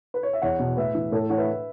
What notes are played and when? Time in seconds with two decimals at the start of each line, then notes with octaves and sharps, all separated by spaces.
0.14 B4
0.23 C#5
0.33 E5
0.42 E2 C#5 F#5
0.59 B2
0.77 A2 B4 E5
0.95 E3
1.12 A2 A4 C#5
1.29 E3 C#5 F#5
1.38 B4 E5